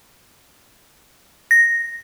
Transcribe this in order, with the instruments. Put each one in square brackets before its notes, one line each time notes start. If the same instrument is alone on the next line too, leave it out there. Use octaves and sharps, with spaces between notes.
[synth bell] A#6